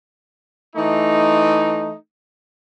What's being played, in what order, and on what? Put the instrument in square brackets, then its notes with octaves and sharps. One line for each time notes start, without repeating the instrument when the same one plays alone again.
[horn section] E3 A3 D#4